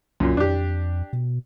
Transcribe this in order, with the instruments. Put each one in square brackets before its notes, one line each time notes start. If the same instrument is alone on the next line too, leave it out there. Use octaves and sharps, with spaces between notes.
[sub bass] C2 [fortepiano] F#2 A#2
[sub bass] F2 [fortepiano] D4 G4
[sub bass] B2